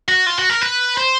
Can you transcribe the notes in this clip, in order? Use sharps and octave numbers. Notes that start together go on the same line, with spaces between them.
F#4
F4
F#4
A#4
B4
C5